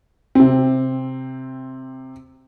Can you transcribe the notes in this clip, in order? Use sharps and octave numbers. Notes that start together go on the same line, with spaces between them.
C3 C4